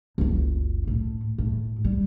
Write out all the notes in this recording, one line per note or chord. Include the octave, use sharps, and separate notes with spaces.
F#1 C#2
A2
A2
G3